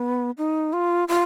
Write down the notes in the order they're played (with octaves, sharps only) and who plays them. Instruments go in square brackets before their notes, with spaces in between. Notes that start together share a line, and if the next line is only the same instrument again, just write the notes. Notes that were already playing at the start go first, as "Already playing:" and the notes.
Already playing: [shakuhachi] B3
D#4
F4
F4